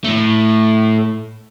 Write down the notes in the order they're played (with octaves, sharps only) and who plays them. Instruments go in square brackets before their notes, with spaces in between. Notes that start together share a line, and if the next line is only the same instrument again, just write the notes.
[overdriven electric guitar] A2 A3